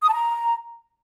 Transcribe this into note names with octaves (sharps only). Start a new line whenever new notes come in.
D#6
A5
A#5